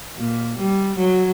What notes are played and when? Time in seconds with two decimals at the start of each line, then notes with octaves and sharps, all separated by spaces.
0.18 A#2
0.58 G3
0.98 F#3